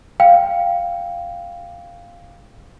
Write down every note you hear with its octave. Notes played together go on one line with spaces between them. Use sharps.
F5 G5